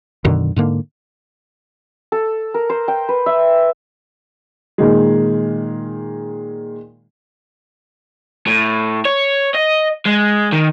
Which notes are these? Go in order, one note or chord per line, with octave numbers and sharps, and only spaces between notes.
F#2 B2 D3 D#3
G#2 D3 A#3
A4
A#4
C5
G5
B4
E5
A#2 D#3 G#3
A2
C#5
D#5
G#3
D#3